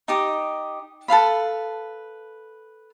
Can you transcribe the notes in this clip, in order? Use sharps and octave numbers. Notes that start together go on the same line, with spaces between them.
D#4 G4 D#5
A4 B4 F5 B5